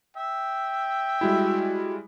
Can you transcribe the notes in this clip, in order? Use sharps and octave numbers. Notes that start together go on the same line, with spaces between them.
E5 G5
G3 G#3 E4 F#4